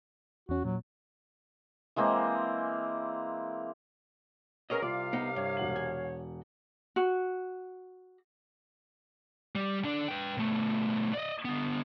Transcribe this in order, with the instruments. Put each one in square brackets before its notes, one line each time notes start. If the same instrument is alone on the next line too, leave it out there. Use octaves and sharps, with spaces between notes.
[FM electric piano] E2 C#4 [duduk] F#4
[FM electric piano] A#2 [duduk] F#3
[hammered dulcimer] E3 G#3 A#3 C4
[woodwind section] B3 C#4 A#4 [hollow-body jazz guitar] G#4 C#5 D#5
[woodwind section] C2 C3 F5 [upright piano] G3 [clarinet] F4 [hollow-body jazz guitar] D5
[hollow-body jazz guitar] B3 D#4
[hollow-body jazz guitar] G2 [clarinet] C#5
[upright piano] E1 F#5 F#7
[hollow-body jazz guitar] G#5
[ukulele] F#4
[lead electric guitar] G3
D3 D4
B4 G5
B2 A3
D5 D#5
D3 B3